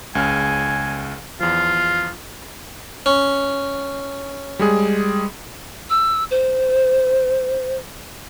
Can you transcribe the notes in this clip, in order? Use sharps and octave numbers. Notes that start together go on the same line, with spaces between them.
C#2 C#3 G#5 F6
E2 F3 F4
C#4
G3 G#3 G#4
E6
C5